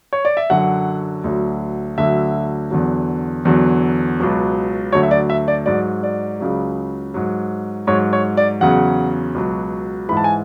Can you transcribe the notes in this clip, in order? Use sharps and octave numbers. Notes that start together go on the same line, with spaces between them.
C#5
D5
E5
F#2 D3 F#3 F#5
D2 D3 F#3
D2 D3 F#3 E5
E2 D3 F#3
E2 D3 F#3
C#2 B2 F#3
D2 D3 F#3 C#5
E5
D5
E5
D5
G#2 F#3 D5
D5
C#2 C#3 F#3
G#2 F#3
G#2 F#3 C#5
C#5
D5
E2 C#3 F#3 F#5
C#2 B2 F#3
G#2 E3 B5
A5
G#5